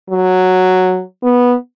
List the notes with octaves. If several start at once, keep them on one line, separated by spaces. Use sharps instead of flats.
F#3
B3